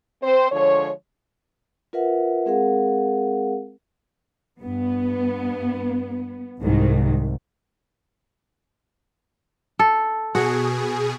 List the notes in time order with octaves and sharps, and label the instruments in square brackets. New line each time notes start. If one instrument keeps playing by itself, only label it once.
[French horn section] C4 C5
D3 F3 G#3 C#5
[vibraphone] F4 A#4 B4 E5 F#5
G#3 C4 G#4 A#4 F5 F#5
[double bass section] G2 [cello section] B3
[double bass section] C2 [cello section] G#2 D#3
[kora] A4
[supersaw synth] B2 G#4 [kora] F#4